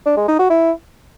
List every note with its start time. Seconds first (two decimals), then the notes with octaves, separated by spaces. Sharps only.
0.06 D4
0.17 G#3
0.28 D#4
0.39 F#4
0.50 E4